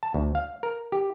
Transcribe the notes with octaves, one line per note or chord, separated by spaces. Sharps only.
A5
D2
F5
A#4
G4